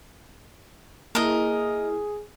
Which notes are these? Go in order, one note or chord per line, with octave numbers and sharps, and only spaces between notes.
A#3 E4 G#4 A#4 D#5